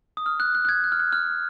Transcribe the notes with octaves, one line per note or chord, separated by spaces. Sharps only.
D#6
F6
F#6
F#6
F#6
G#6
F#6
F6
F#6
F6